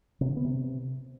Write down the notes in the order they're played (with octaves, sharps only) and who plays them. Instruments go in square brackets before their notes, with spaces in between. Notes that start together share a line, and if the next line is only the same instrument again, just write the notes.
[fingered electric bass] C3
D3
B3
C3